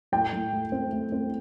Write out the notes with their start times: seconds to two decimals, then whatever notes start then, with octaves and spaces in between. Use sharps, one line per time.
0.12 A2 G5
0.33 A2
0.53 A3
0.72 C4
0.92 A3
1.12 C4